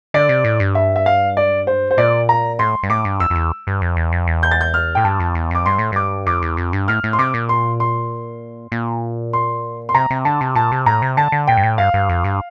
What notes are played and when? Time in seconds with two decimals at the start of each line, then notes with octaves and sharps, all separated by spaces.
0.14 D3 D5
0.29 C3
0.44 A2
0.60 G2
0.75 E5
0.96 E5
1.06 F5
1.37 D5
1.67 C5
1.91 C5
1.98 A#2 D5
2.29 A#5
2.59 A2 C6
2.83 G2
2.90 A2 D6
3.05 G2
3.20 F2 E6
3.30 F2
3.36 E2
3.67 G2
3.82 F2
3.97 E2
4.12 F2
4.27 E2
4.43 G6
4.51 A6
4.61 G6
4.74 F6
4.95 A2 G5
5.04 G2 A5
5.20 F2
5.35 E2
5.51 F2 D6
5.66 G2 C6
5.78 A2
5.92 G2 D6
6.26 F2 D6
6.42 E2
6.57 F2
6.73 G2
6.88 A2 F6
7.04 A2
7.13 C6
7.19 C3 D6
7.34 A#2
7.49 C6
7.80 C6
8.72 A#2
9.33 C6
9.89 C6
9.94 C3 A#5
10.11 C3
10.25 D3 A5
10.41 C3
10.55 A#2 A5
10.72 C3
10.86 A2 A#5
11.02 C3
11.17 D3 A5
11.32 D3
11.48 A#2 G5
11.57 G2
11.63 A2
11.78 G2 F5
11.94 G2
12.09 F2
12.24 G2